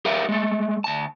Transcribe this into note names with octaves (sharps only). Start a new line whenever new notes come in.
G4 A#4 B4 E5 F5
G#3 A3
D2 A5